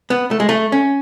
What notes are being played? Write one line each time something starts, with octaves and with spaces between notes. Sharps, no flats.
B3
A3
G#3
A3
C#4